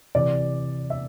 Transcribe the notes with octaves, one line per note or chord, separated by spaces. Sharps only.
C3 E3 D5
E5